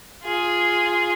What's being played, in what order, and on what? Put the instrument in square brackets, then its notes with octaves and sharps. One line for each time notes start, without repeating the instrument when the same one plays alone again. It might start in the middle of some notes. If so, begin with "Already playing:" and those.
[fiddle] F4 G#4